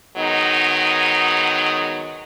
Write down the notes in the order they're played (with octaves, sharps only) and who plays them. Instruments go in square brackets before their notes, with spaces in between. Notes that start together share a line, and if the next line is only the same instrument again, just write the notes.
[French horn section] D#3 F#3 G#3 B3 D#4